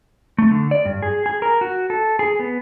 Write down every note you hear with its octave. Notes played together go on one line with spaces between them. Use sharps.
A3
D3
D5
G2
G#4
G#4
A#4
F#4
A4
G#4
B3